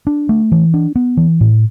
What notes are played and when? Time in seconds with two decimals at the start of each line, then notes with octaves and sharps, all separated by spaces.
0.07 D4
0.29 A3
0.52 E3
0.74 D4
0.96 B3
1.17 E3
1.41 A2